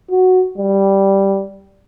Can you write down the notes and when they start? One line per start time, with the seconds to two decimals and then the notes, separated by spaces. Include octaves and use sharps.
0.10 F#4
0.58 G3